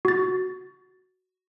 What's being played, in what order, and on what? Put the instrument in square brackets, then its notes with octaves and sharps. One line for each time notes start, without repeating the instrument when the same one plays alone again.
[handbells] F#4 A6